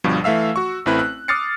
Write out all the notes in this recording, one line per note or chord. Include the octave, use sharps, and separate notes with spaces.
G1 G2 B2 F3
E3 A3 E5 F5 E6
F#4 C#6
A1 A3 C4 E4 B4 F#6
F#6
D6 D#6 F6 A6 C7 C#7